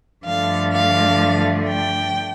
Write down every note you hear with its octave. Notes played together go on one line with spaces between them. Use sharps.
G2 D3 F3 A3 F5
F5
G5